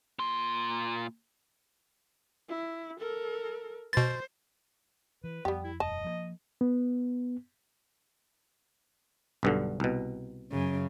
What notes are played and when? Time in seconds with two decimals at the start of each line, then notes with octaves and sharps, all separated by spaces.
0.19 A#2 C6
2.48 E4
3.00 A4 A#4
3.93 B2 C5 A6
5.24 E3 B4
5.45 F2 G3 B3 G4
5.64 E4
5.80 E1 F#2 D#5 A5
6.04 F3 F#3 A#3
6.61 B3
9.43 B1 G2 D3
9.80 C2 B2
10.52 F#2 C#3